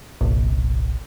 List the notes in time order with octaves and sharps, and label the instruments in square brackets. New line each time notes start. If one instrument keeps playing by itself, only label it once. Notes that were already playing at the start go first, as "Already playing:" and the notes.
[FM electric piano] G1 C2 A#2